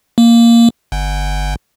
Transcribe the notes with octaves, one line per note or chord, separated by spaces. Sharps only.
A#3
G1